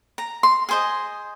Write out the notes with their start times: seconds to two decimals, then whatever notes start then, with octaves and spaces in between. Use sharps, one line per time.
0.18 A#5
0.43 C6
0.69 G#4 C5 D#5